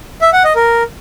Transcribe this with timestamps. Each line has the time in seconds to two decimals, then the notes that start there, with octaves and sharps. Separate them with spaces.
0.22 E5
0.33 F#5
0.44 D#5
0.56 A#4